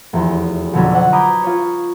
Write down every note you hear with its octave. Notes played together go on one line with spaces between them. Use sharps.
F1 E2
F2 B2 D3 F#3 C#4 D4
D#4 C5 F#5
A#5 B5 D6 D#6 G6 G#6
F4 C#5